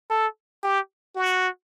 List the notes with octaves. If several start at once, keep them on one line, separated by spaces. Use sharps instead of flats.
A4
G4
F#4